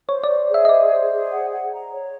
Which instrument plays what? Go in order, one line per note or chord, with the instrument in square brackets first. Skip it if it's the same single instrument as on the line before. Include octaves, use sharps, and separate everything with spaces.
[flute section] C5 [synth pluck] C#5
[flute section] C5 [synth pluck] D5
[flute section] G#4
[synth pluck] E5
D#5
[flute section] C5 [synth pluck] D5
[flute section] C5
G#4
F#5
F#5
A#5
C#5